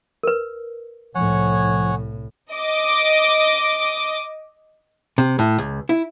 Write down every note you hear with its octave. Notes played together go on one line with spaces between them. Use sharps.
A#4 B4
C2 A2 F3 C#5 F#5 G#5
D#5 D6
C3
A2
C#2
E4